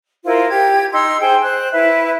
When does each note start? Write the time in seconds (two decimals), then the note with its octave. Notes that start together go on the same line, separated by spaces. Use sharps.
0.25 E4 F4 A#4 C5
0.49 G4 G#6
0.93 D#4 C6 E6
1.20 G#4 C5 G5
1.43 C5 F#6
1.72 E4 B4 E5